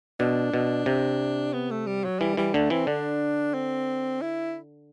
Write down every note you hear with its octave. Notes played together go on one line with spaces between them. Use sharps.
B2 D4
B2
C3
B3
A3
G3
F#3
E3 G3
E3 G3
D3 A3
E3 C4
D3 D4
C4
E4